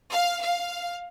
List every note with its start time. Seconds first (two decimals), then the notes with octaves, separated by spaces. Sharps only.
0.11 F5
0.41 F5